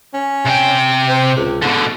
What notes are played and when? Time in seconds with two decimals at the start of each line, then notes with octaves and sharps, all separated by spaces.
0.14 C#4
0.45 C3 G5
1.09 C4
1.37 C#2
1.62 G#2 B2 D3